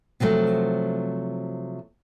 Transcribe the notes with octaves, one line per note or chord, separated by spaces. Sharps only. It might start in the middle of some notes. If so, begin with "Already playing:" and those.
C3 F3 F#3 A3